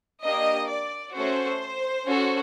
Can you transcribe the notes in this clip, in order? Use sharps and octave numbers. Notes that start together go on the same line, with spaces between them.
A#3 D4 G4 D#5
D5
A3 C#4 F#4 A4 C5
C#4 F#4 A4